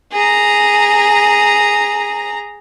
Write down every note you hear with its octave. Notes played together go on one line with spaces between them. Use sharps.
G#4 A#5